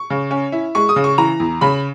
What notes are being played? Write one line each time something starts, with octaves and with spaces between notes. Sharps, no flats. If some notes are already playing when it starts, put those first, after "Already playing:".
Already playing: C#6
C#3
C#4
E4
G#3 C#6
D#6
C#3
C#6
E3 A#5
E2
C#3 B5